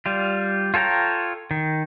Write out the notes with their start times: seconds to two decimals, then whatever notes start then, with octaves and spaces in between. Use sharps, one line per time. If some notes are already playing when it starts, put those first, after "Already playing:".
0.06 G3 F4
0.74 F4 A4 C#5 G5 A#5
1.51 D#3